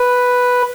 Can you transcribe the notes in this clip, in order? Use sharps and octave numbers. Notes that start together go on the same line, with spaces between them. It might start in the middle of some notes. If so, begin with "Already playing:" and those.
Already playing: B4